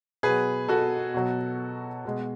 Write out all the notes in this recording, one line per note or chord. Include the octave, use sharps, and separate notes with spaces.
B2 F#3 G#4 B4
F#4 A4
B2 F#3
B2 G#3